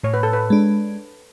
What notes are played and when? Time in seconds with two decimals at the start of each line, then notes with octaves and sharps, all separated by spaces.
0.03 A2 C#5
0.14 B4
0.23 A4
0.33 B4
0.50 G#3 D4